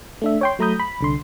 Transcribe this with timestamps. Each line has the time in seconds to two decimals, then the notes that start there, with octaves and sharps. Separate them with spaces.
0.22 A3 D4 E5
0.41 C#5 G5 C6
0.59 F#3 A3 A#5 B5 D#6 G6
0.80 B5
1.01 C2 D3 C6